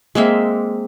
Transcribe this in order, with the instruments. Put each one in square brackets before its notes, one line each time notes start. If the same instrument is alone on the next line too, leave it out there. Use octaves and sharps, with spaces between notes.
[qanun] G#3 A#3 C4 E5